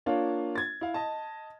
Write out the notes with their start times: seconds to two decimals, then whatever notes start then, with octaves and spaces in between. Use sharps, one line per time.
0.06 A#3 D4 F4 C#5 F5
0.55 G#6 A6
0.81 E4 F5
0.94 D#5 A5